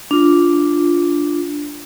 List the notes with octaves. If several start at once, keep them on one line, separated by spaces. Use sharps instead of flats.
D4 F4